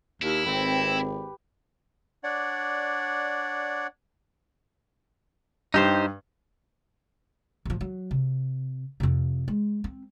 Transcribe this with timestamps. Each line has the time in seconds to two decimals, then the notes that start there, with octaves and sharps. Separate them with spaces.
0.22 D#2 E4
0.46 G#1 C4 G4 B4
2.24 D4 C#5 D5 F#5
5.74 G2 D#4 G4 C5
7.65 A1 F3
7.81 F#3
8.11 C3
9.00 F2 C3
9.48 G#3
9.84 C4